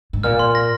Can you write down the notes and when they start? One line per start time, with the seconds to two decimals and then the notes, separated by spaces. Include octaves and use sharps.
0.13 G#2
0.23 A#2 F6
0.39 C6
0.55 A#6